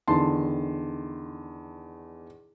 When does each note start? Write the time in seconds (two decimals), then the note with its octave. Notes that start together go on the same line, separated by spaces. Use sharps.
0.08 E2 D3 D#3 A5 C6